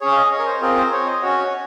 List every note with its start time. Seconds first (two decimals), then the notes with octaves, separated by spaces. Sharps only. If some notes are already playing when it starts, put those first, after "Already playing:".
0.01 C#4 G#4 C#5
0.12 F5
0.17 D#5
0.31 C#5
0.39 A#4
0.46 C5
0.61 C4 F4 G#4 A#4
0.77 C5
0.92 C#5
1.06 D#5
1.21 C#4 F#4 C#5